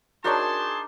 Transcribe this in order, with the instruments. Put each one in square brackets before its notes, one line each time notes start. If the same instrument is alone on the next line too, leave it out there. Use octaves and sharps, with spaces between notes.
[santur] D4 D#4 A#4 [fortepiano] F#4 C#5 [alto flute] G#4 [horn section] A5 C6